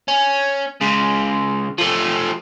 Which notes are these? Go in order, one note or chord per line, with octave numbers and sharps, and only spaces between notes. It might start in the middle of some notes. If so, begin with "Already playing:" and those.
C#4
C#3 G#3
F3 A3